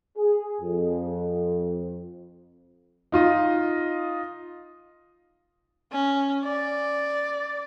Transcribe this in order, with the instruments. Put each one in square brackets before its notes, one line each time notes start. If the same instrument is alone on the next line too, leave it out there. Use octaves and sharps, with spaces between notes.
[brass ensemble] G#4
F2
[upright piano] D#4 F4 D#5
[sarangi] C#4
D5